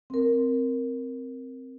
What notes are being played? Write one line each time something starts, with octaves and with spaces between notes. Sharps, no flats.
C4 A#4